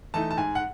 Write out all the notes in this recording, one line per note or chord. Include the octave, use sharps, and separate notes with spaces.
E3 A3 D#4 A5
A5
G#2 G#5
F#5